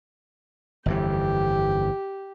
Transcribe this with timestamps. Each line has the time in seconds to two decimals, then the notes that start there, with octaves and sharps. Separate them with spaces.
0.86 G1 F2 E3 G4